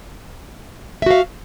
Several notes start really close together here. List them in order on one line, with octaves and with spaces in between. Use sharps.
E5 F#4 F5